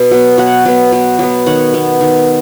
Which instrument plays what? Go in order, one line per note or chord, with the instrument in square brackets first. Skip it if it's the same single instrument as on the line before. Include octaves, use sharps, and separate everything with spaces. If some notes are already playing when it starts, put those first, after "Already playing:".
Already playing: [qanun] B2 B4
F#3 B3
B2 C#5 F#5
F#3 B3
B2
F#3 B3
D#3 C#5 F#5
B3
D#3